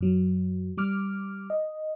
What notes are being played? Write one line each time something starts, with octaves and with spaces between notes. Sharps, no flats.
F#2 F#3
G3 D6 F6
D#5